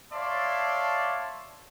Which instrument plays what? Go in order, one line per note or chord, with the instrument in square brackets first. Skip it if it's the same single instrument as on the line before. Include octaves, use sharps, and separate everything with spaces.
[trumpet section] C#5 D5 E5 F5 A5 C6